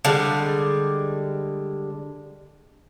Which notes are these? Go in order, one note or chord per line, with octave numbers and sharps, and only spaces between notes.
D3 G3 G#3